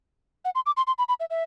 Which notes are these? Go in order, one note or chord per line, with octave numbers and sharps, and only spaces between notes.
F#5
C6
D6
C6
C6
B5
B5
E5
E5